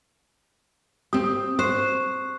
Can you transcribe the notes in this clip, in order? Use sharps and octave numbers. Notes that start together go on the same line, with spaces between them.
C4 G4 D#6
C5 C#6 F#6